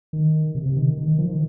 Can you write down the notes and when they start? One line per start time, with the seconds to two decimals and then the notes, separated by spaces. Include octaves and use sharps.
0.13 D#3
0.55 C3
0.66 C3
0.76 D#3
0.98 D#3
1.08 D#3
1.18 F3
1.29 D#3